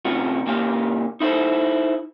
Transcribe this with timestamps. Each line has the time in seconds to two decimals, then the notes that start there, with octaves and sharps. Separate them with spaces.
0.05 C3 A3 C#4 F4 F#4
0.46 A#2 C#3 A#3 G4 F5
1.20 D#4 E4 A4 C5